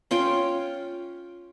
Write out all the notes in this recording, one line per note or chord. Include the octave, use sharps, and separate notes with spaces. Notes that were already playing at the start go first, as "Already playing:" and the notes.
C#4 F4 C#5 G5